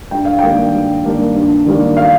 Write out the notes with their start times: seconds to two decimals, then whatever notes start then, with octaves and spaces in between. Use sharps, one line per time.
0.11 G2 G5
0.25 F5
0.39 D#3 G3 A#3 D4 G5
0.73 G2
1.05 D#3 G3 A#3 D4
1.35 G2
1.66 D#3 G3 A#3 D4
1.97 F5